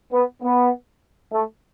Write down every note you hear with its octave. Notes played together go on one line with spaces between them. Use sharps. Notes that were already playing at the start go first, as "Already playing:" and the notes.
B3
B3
A3